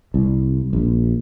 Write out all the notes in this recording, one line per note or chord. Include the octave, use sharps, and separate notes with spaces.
C2
A#1